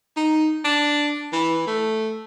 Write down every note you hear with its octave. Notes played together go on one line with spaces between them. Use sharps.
D#4
D4
E3
A3